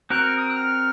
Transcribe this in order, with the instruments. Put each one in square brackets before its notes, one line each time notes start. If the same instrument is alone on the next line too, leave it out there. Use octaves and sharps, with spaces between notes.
[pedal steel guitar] C4 F#4 A#4 [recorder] F#6
[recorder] F6
D#6
F#6
F6